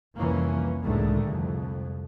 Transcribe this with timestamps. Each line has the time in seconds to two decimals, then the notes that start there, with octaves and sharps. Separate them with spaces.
0.16 C2 F2 E3 A#3 C#4
0.83 C#2 A2 D3 D#3 G#3 A3
1.25 C2 F2